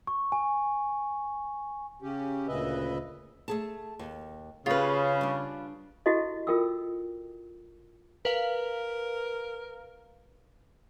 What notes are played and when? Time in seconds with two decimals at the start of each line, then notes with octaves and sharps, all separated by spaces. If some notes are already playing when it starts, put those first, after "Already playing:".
0.07 C#6
0.32 G#5
2.02 C#3 C#4 G4
2.48 D2 A#2 C#3 B4 D#5 E5
3.48 A3 G#4 A5
3.99 D#2
4.66 C#3 C#4 F4 G4 B4
5.21 G3 D4
6.06 E4 F#4 G4 A4 D#5
6.47 F4 A4 A#4 G5 D#6 E6
8.25 A#4 B4 F5